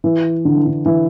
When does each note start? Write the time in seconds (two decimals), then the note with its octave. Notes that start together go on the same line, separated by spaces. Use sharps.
0.04 E3
0.45 D3
0.56 E3
0.67 D3
0.86 E3